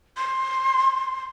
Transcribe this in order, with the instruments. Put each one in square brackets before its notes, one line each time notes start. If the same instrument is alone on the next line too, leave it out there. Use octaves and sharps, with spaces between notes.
[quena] C6